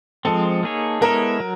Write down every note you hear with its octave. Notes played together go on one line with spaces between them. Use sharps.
F3 G#3 C4 A4
A#3 D#4 G#4 C#5
G#3 B3 E4 A4 A#4 C#5
F#3